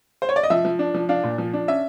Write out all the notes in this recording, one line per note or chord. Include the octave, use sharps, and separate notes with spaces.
C5
C#5
D5
D#5
F3 E5
F3
D4
F3
D4 F5
A#2
F3
D4
C#4 E5